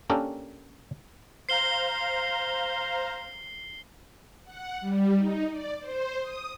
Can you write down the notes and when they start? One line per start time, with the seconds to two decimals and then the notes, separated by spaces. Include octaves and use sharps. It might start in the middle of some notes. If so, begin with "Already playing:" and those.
0.10 A#3 C#4 D4 G4 A4 A#4
1.49 C5 F5 A#5 C7 G7
4.44 F#5
4.81 G3
5.15 D#4
5.50 D5
5.80 C5
6.21 D#6